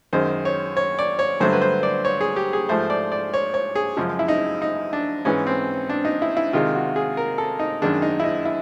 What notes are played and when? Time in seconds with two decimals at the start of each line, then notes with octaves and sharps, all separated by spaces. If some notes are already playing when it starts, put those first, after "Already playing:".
0.13 F#2 D#3 G#3 C5
0.45 C#5
0.77 C#5
0.99 D5
1.19 C#5
1.40 G2 D3 F#3 A3 C5
1.53 B4
1.62 C5
1.83 D5
2.05 C#5
2.21 G#4
2.36 G4
2.53 G#4
2.69 G#2 F3 A3 C5
2.90 D5
3.12 D5
3.34 C#5
3.54 C#5
3.75 G#4
3.97 F#2 C#3 F3 G#3
4.19 E4
4.28 D#4
4.62 D#4
4.93 D4
5.25 G#2 E3 G#3 C#4
5.47 C4
5.90 D4
6.05 D#4
6.22 E4
6.37 E4
6.53 C3 D#3 G#3 F4
6.75 F#4
6.96 G#4
7.17 A#4
7.38 A4
7.59 D#4
7.82 F#2 D#3 G#3 D4
8.02 D#4
8.20 E4
8.24 D#4
8.45 E4